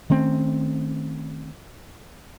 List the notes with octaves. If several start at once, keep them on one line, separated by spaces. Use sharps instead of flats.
D#3 A3 C4 C#4